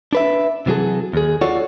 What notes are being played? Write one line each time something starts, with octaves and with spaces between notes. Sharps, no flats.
D4 B4 E5
C3 E3 F#3 G#4 A4
D#2 G#4
F4 F#4 A4 C#5 D5 F#5